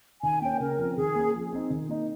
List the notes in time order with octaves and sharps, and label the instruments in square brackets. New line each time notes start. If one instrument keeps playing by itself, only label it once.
[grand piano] D#3 [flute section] G#5
[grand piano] A#3 C#4 [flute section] G5
[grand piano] C#3 [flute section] A#4
[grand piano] F3 C4
[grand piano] D#3 [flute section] G#4
[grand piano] A#3 C#4
F3
C4 D#4
D#3
A#3 D#4